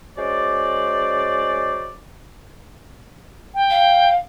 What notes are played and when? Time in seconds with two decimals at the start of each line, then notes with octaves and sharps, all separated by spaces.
0.18 G#3 C#4 F#4 C5 D5
3.54 G5
3.70 F5